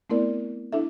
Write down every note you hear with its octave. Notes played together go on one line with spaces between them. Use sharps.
A3 B3 C4 E4 A#4 D5
D4 E4 A4 E5